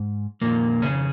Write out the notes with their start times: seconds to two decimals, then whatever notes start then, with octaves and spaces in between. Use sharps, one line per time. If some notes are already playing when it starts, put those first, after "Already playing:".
Already playing: G#2
0.41 F2 A#2 D#3 A#3
0.82 C#3 C#4